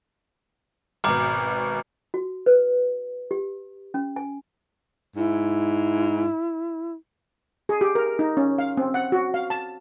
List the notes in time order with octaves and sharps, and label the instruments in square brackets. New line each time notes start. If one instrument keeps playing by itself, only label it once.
[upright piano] G#1 B2 [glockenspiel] A#5 D6 F6
[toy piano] F#4
B4
G4
C#4
G#5
[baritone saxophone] G#2 [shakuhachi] E4
[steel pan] G#4
G4
A#4
D#4
C#4
F5
C4
F#5
F#4
F5
A5